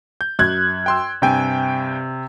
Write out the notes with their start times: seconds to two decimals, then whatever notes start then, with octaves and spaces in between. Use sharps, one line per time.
0.21 G6
0.39 F#2 F#6 G#6
0.86 G5 C6 E6
1.22 G2 C3 G5 G#5